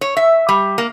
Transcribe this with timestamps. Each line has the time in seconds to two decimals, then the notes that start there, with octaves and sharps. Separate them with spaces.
0.01 C#5
0.17 E5
0.49 G3
0.78 A#3